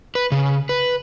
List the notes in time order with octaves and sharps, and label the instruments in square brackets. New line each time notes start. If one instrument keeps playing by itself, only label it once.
[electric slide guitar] B4
C#3
B4